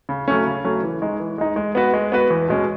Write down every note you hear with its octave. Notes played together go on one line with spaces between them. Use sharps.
C#3
F#3 A3 C#4
C#3
F#3 A3 C#4
E3
G#3 D#4
E3
G#3 D#4
G#3
B3 F#4 B4
G#3
B3 F#4 B4
E2
B2 G#3 C#4